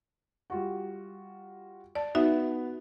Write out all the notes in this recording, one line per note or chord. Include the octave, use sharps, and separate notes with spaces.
G3 F4 F#4
D5 A5
B3 D#4 F#4 E5